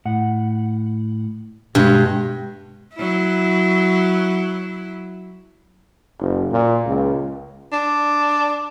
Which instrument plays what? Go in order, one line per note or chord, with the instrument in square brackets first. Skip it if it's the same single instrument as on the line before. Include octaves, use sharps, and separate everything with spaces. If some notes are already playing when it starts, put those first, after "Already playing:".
[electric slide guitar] A2 F#5
[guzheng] G2 [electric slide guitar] B2 G#3
[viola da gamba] F#3 E4
[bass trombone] F#1
A#2
C#2
[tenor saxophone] D4